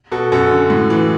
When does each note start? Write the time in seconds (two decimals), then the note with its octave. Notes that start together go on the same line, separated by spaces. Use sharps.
0.12 B2 F#4 A4
0.32 F#2 F#4 A4
0.51 D3
0.70 A2
0.90 E3